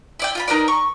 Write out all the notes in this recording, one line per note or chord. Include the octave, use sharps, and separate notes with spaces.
E4 D5 G5
F4 F5 B5
D#4 A#4 B4 D5
C#6